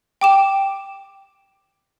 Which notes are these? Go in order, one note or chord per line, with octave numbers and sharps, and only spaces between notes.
G5 D6 E7